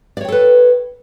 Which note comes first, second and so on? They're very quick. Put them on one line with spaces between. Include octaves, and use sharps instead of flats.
D5 C#5 G5 A4 B4